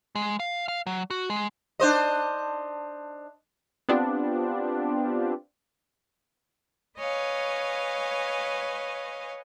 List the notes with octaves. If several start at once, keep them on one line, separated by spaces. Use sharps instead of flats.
G#3
F5
F5
F#3
F#4
G#3
D4 C5 D#5
B3 C4 D4 F4 G4
B4 C#5 D#5 F5 G#5